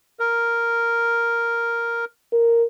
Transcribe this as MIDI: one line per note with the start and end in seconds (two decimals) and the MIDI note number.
0.20 2.05 70
2.33 2.64 70